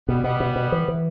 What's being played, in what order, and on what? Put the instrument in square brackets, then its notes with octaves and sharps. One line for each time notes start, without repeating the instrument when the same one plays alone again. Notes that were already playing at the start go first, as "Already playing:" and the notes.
[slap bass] B2 [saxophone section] G3 B3
[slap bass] B2 [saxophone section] G3 B3
[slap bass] B2
B2
E3
E3